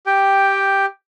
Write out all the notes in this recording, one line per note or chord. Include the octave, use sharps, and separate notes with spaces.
G4 G5